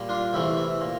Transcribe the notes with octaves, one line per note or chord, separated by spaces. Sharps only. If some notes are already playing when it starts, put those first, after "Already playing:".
Already playing: A#2 G3
D4 F4
E2 C3 E3 A3 E4
E4
A#2